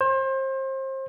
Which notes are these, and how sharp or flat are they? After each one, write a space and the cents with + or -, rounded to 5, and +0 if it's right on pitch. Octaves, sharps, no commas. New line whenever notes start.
C5 +30